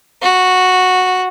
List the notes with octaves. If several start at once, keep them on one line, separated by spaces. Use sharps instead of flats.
F#4